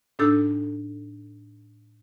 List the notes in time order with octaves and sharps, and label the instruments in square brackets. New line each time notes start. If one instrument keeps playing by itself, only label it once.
[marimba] A2 D4 D#4 A4 E6 G6